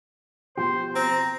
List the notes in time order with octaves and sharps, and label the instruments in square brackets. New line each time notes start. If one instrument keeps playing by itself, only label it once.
[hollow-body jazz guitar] B2 F3 G4 [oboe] C5
[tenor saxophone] C4 [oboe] A#5